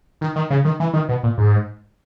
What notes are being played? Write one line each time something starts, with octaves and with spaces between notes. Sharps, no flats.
D#3
D#3
C#3
D#3
E3
D#3
B2
A#2
G#2